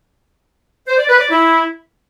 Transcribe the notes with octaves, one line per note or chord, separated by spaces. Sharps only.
C5
D5
B4
D5
E4